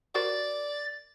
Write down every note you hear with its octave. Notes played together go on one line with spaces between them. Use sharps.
F#4 A#4 C5 D5 A6